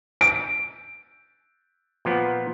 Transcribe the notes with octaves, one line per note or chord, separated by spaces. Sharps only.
D7
A#2 F3 B3